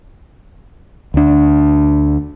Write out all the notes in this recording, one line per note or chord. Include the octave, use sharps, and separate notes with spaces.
D2 D4